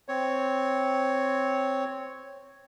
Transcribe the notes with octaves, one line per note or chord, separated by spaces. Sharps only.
C4 C#5